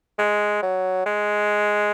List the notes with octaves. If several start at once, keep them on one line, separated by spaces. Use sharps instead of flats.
G#3
F#3
G#3